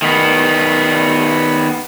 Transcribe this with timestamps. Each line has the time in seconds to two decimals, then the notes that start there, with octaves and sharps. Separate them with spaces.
0.02 D#3 B3